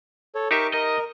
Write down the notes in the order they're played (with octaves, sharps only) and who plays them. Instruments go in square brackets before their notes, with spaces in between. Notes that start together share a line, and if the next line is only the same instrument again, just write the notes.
[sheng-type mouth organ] A4 C#5
[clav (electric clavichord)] D#4 G4 E5 [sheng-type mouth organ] A#4 C#6 D6
[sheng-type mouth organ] A#4 [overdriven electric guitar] D#5